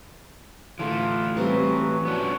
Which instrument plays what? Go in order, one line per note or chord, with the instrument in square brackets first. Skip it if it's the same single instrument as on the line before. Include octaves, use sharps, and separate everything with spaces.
[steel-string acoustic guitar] D3 [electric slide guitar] E3 A3 [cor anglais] F4
[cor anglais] F#3 [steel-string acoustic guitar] G3 C4 B4
[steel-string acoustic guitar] F3 [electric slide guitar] B3 C#4 D4 [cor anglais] F#4